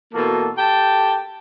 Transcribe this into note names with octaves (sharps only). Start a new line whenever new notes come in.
B2 E3 A#3 F#4 A4
G4 A4 G5 A5